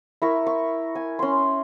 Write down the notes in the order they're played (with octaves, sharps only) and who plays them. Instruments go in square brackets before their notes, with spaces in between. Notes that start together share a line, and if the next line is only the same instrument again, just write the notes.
[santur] E4 A#4 C#6
C#6
G#5
C#4 C6